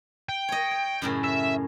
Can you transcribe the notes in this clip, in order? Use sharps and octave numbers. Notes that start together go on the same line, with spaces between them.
G5
C#5 D#5
C#5
F#2 A2 C#3
E5